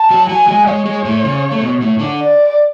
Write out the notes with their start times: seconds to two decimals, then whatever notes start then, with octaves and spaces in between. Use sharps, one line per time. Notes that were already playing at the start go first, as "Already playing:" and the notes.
Already playing: A5
0.10 F#3 F#4
0.29 F#3 F#4 G#5
0.48 G#3 G#4
0.67 G#3 G#4 C#5
0.86 G#3 G#4
1.05 A2 A3
1.24 C#3 C#4
1.51 A3
1.61 B2 B3
1.81 A2 A3
1.99 D3 D4
2.19 D5